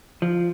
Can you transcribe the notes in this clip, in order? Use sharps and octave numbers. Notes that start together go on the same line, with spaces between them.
F3